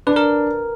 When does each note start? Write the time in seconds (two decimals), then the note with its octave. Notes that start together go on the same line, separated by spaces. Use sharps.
0.07 D4 B4
0.16 A#4